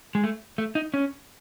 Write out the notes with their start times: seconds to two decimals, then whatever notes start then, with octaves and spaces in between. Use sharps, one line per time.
0.15 G#3
0.24 A3
0.58 A3
0.75 D#4
0.94 C#4